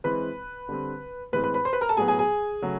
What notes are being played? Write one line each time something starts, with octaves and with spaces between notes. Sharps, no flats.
E3 G#3 C4 B4 B5
D3 G3 C4
A2 E3 G#3 C4 B4 B5
B4 B5
B4 B5
C5 C6
B4 B5
A#4 A#5
A4 A5
A2 F#3 B3 G#4 G#5
G#4 G#5
G#4 G#5
C#3 F#3 A3